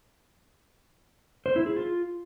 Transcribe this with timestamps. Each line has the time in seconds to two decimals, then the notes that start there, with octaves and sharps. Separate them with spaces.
1.46 C5
1.56 E4
1.66 G#4
1.76 F4